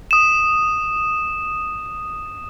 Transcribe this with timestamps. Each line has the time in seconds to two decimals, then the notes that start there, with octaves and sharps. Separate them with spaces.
0.11 D#6 E7